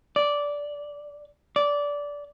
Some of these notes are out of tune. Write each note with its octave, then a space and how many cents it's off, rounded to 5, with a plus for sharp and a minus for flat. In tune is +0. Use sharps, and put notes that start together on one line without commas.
D5 -10
D5 -15